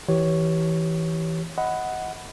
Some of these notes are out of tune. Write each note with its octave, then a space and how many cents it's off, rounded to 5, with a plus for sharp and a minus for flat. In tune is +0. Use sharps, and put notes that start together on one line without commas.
E3 -10 G4 -25 C#5 +0
D#5 +25 F#5 +0 B5 +15